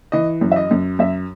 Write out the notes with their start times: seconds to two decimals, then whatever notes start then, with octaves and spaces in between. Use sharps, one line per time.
0.12 E3 D#5
0.41 F#2
0.52 E5
0.56 D#5
0.71 F#2
0.99 F#2 E5